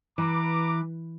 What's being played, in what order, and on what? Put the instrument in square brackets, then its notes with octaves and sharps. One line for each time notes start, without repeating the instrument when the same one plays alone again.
[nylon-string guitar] E3 [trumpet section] B4 A#5 D6